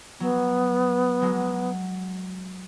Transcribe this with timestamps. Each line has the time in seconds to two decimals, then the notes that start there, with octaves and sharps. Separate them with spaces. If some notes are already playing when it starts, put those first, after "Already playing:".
0.20 F#3 B3
1.22 F#3 G#3